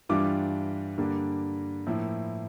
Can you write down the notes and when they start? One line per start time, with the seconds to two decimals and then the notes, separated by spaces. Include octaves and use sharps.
0.09 G2 E3 G3 D4 F4 D6
0.98 G2 D3 G3 A#3 D4
1.87 A2 F3 A#3 E4